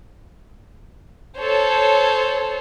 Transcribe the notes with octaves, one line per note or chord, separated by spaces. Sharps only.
A4 C5 C#5